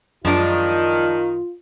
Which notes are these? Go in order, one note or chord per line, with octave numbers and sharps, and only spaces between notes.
F#2 D#3 F3 G#3 D4 F4